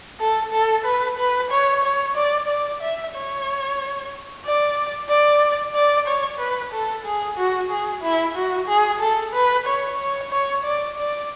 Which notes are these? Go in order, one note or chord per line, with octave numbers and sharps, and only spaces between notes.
A4
A4
B4
B4
C#5
C#5
D5
D5
E5
C#5
D5
D5
D5
C#5
B4
A4
G#4
F#4
G#4
E4
F#4
G#4
A4
B4
C#5
C#5
C#5
D5
D5